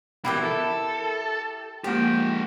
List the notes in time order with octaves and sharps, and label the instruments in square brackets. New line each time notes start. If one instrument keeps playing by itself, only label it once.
[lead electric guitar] B2 E3 [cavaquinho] E4 G4 E5 [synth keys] A#4 B5
[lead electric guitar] A4
[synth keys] F3 G#3 A#3 [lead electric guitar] G4 F#5 [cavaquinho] G5